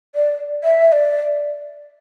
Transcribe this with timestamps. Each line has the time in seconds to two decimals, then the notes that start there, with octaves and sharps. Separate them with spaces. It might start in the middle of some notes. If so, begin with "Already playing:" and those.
0.15 D5
0.64 E5
0.88 E5
0.92 D5